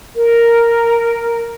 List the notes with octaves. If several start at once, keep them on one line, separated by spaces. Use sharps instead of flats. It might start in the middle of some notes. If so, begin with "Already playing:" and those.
A#4